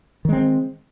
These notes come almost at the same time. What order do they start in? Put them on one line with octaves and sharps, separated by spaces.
D#3 G#3 C4